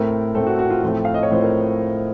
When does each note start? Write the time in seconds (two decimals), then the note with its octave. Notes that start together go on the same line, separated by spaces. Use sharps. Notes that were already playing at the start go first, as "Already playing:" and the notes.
Already playing: A2 A3 C4 A#4
0.35 A2 A3 C4 A4
0.47 F#4
0.59 F#4
0.70 F4
0.82 A2 F3 A3 C4 F4
1.05 F5
1.14 D#5
1.23 C#5
1.30 A2 F3 A3 C4 C5
1.42 A#4